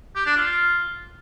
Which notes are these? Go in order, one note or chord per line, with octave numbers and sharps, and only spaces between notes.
G4
D4
F4